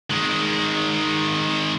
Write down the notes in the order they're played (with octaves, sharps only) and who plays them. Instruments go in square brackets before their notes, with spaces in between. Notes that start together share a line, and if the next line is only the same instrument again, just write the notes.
[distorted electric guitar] D#3 G#3